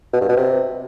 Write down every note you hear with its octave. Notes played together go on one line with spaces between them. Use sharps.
B2
G2
B2
C3